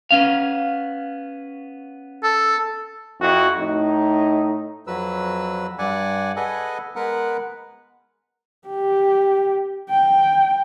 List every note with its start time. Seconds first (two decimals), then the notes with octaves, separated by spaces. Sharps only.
0.11 B3 C#4 F5
2.23 A4
3.20 F2 E4 F#4
3.58 A2 D#4
4.87 F2 F#3 B4 E6
5.79 G2 D5 F#5 G#5
6.36 G#4 A4 B4 D#5 F#5 G#5
6.96 G#3 B3 A#4 B4 F#5
8.68 G4
9.90 G5